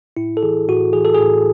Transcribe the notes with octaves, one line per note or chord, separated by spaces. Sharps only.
A2 E4
A4
E3 G#4
A2 F#4
E3 G#4
A4
G#4
A2